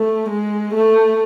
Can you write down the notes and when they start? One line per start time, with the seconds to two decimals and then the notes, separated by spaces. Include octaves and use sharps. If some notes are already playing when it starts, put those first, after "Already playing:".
Already playing: A3
0.30 G#3
0.75 A3